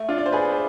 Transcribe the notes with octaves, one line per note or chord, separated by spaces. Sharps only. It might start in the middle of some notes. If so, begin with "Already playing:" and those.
Already playing: A3
D4 F4
D5
C5
G#4 B4
B4